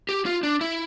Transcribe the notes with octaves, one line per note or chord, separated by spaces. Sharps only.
G4
F4
D4
E4